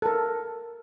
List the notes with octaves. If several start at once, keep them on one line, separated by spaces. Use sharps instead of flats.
A4 A#4